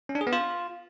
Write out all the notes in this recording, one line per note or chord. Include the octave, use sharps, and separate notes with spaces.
C#4
D4
G#4
B3
F4